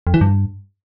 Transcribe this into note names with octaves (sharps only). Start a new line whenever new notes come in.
F2
E3
G2